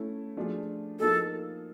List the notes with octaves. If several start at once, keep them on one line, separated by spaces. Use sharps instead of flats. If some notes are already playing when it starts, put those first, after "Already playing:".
Already playing: A3 C#4 E4 A4
F3 A3 D4 F4 G#4
F3 A#3 D#4 G#4 A4